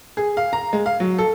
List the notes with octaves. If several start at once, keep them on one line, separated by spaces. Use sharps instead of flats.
G#4
F5
A#5
G#3
F5
F#3
A4